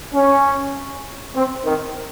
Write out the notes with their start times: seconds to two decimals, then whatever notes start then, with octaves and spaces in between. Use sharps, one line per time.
0.14 C#4
1.34 C4
1.64 D#3